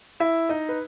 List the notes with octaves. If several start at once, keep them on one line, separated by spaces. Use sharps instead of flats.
E4 E5
D#4 D#5
B4